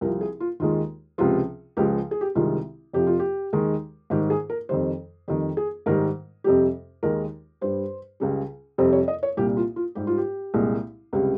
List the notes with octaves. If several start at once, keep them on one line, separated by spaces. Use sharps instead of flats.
C2 C3 F3 A#4
G#4
F4
D#2 D#3 G#3 F4
C#2 C3 F3 F4
C#2 C#3 F3 G#3 G4
G#4
G4
C2 C3 D#3 G#3 F4
F2 C3 F3 G4
F4
G4
D#2 D#3 G#3
G#2 D#3 G3 G4
G#4
A#4
F2 D#3 G3 C5
F2 D#3 G3 G4
G#4
G#2 D#3 G3 A#4
F2 C3 G3 G4
D#2 D#3 G#3 A#4
G2 G3 C5
C#2 C#3 G3
F2 C3 G3 C5
C#5
D#5
C#5
C2 A#2 G3 G4
F4
F4
G#2 G3 G4
F4
G4
C2 A#2 G#3
C#2 C3 G3